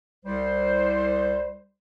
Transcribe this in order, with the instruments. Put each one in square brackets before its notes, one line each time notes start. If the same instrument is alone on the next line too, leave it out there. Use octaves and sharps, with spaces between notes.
[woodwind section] C2 G3 C5